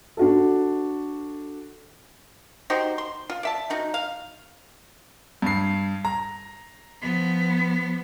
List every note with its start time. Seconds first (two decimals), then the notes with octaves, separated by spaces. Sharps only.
0.17 D4 F#4 A4
2.70 D#4 F#4 G4 C5
2.98 C6
3.30 F4
3.43 D5 E5 A5
3.70 F3 D#4 F#4
3.94 F5
5.42 G2 C7
6.05 A#5
7.02 F3 B3